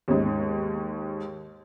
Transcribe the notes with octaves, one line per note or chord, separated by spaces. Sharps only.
D#2 G#2